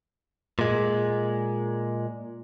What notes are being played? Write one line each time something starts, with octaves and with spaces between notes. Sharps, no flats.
A#2 G#3